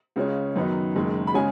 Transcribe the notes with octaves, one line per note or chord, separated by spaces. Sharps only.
C#2 C#3 G#3 C#4
F#2 D#3 F#3 B3 D#4
F#1 F#2 D#3 G#3
B5
C#3 G#3 C#4 G#5